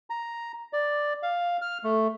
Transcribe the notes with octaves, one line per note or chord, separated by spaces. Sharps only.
A#5
D5
F5
F6
A3